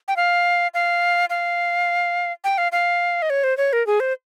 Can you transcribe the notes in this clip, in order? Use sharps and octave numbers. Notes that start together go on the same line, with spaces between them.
G5
F5
F5
F5
G5
F5
F5
D#5
C#5
C5
C#5
A#4
G#4
C5